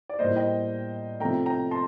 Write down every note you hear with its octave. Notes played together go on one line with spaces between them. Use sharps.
D5
A2 G3 A#3 C5 D#5
D#5 G5
C3 F3 A3 G5 A#5
G5 A#5
A5 C6